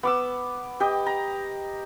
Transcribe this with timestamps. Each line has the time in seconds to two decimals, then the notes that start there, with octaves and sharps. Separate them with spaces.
0.03 B3 D6 E6
0.80 G4 D#5 G5
1.06 A#5